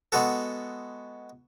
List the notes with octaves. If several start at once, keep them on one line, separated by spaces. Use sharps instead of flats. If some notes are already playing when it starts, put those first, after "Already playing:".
G#3 B3 F#4 A4